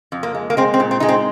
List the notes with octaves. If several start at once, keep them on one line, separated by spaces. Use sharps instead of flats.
F2
A#3
G#3
A#3
G#3 C4
C4
A#2
C4
G#3 D#4
C4